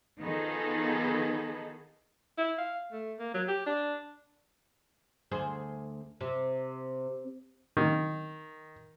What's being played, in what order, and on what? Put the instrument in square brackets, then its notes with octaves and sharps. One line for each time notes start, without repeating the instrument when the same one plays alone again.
[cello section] D#3 F3 B3 D#4 G#4 A4
[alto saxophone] E4
F5
A3
A#3
F#3
G4
D4
[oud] D2 G#4 C5
C3
[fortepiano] D#3